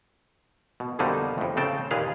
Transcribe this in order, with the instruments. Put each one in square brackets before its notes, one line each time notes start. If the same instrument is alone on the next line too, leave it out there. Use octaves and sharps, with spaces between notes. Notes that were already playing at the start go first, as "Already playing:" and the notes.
[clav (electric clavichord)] B2
F2 B2 D3 G3 A#3 D#4
F2 A2
C#3 C4 G5 A5
D#2 A#2 G#4 B4 F5